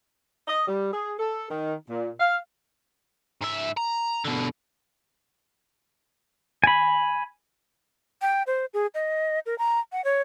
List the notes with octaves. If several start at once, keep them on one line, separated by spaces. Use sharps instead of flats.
D#5
G3
G#4
A4
D#3
A#2
F5
G#2 E5
A#5
B2 D3
G#5 B5
G5
C5
G#4
D#5
A#4
A#5
F#5
C#5